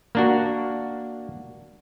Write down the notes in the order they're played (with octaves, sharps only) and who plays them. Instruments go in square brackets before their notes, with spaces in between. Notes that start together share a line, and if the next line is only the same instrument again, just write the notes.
[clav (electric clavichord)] A#3 D4 F#4